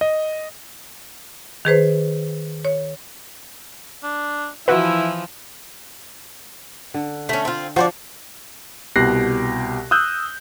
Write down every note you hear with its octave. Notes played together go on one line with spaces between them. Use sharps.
D#5
D#3 G#4 B4 C5
C#5
D4
E3 F3 E4 F#4 B4
D3
A3 C#4
C4 F4
F3 F#4 C5 D5
C2 B2 G4 F#6 A#6 C7
D#6 E6 F#6 G6